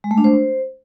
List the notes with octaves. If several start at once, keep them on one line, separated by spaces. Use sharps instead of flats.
G#3
A3
D4
C5